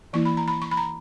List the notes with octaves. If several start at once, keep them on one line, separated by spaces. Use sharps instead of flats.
E3 A#3 E4 C#6
B5
A#5
B5
C#6
B5
A#5